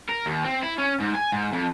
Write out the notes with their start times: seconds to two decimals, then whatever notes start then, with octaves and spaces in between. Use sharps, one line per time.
0.09 A#4
0.26 D#2
0.45 C4
0.63 E4
0.78 C#4
1.00 G#2
1.15 G#5
1.32 G#2
1.52 F2